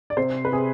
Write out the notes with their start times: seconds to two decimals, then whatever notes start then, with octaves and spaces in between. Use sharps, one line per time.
0.10 D5
0.17 C3 C5
0.45 B4
0.52 C3 G#4